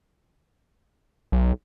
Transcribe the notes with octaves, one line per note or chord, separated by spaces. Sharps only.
B1